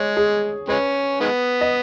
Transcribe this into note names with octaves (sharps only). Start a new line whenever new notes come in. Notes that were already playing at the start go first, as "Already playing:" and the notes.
Already playing: G#3 C#5
G#4
G#3 C#4 B4
D#3 G#3 B3
D#5